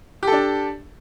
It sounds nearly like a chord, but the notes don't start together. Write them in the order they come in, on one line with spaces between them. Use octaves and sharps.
G4 A4 D4